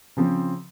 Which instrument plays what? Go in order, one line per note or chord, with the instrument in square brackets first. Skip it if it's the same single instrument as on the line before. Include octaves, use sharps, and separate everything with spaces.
[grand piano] C#3 F3 C4